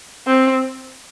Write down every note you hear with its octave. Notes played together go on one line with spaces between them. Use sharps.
C4